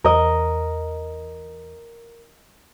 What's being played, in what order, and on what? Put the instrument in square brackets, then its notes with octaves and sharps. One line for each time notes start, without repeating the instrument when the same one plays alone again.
[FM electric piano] E2 [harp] A#4 D#5